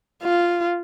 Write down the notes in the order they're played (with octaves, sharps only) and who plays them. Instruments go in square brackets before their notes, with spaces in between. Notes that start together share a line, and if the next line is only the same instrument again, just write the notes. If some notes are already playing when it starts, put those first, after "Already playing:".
[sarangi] F4